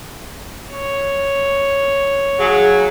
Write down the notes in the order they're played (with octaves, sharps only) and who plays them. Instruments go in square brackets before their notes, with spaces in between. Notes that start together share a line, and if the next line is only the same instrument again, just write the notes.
[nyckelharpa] C#5
[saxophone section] G#2 C#3 F#3 [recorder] G#4